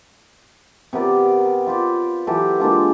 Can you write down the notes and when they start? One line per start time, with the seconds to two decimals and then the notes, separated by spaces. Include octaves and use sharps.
0.93 C3 B3 A#4 D5
1.67 F4 B4 C5 D5
2.27 E3 F#3 G4 A4
2.60 G#3 A#3 D4 F4